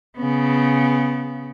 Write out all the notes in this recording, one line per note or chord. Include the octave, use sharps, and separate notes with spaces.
C#3 B3